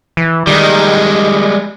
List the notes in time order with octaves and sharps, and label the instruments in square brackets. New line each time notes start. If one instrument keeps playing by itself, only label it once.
[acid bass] E3
[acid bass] D#3 [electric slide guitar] G3 G#3